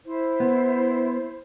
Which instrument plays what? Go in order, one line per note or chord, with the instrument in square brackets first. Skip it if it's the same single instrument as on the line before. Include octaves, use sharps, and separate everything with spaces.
[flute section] E4 C5
[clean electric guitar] B3